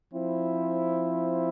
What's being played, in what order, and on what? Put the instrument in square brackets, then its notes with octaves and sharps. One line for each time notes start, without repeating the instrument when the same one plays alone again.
[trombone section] F3 C4 E4